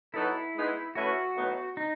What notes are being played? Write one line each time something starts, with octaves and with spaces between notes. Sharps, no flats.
F#3 B3 D#4 E4 A4
G#3 B3 D#4 G#4
A3 C#4 E4 F#4 B4
A2 F#3 B3 D#4
D#4